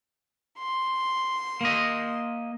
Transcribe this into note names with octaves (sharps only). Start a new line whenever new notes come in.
C6
A#3 D#5